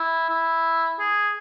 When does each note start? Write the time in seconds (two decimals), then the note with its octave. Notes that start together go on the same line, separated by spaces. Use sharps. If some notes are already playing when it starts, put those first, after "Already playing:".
Already playing: E4
0.29 E4
0.99 G#4